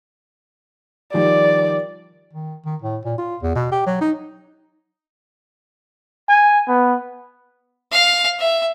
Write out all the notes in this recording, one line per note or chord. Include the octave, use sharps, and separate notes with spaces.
D#3 F3 G3 D5
D#3
D#3
A2
A#2
F4
E2
B2
G4
F#3
D#4
G#5
B3
F5
E5